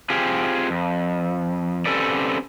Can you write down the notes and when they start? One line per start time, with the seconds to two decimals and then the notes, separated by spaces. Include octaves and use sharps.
0.10 C4 F4 G4 G#4
0.70 F2
1.86 C4 C#4 G4 A4 B4 D5